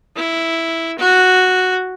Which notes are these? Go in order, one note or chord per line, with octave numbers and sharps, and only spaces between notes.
E4
F#4